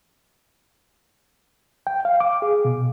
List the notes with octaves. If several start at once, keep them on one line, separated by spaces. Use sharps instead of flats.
G5
F5
D6
G#4
B2